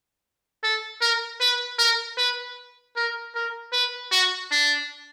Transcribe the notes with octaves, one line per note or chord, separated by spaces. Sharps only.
A4
A#4
B4
A#4
B4
A#4
A#4
B4
F#4
D4